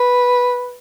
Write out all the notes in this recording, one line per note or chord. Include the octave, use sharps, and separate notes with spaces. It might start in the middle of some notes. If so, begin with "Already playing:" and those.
Already playing: B4